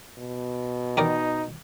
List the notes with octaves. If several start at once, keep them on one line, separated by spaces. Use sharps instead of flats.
B2
D#4 G4 A#4 D5